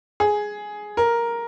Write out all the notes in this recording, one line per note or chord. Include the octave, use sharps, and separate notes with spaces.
G#4
A#4